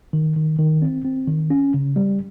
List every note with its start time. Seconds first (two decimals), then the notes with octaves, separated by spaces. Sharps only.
0.13 D#3
0.36 D#3
0.59 D#3
0.82 C4
1.05 C4
1.28 D#3
1.50 C#4
1.74 C#3
1.96 G3